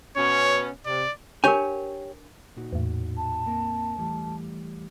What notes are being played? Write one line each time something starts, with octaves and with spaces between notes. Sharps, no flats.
B2 B3 C#4 C#5
C3 D5
D4 G4 A#4 C#5 G#5
A#2 D#4 F#4
E2 A2
A5
A#3 C4 A#4
E3 G3 A3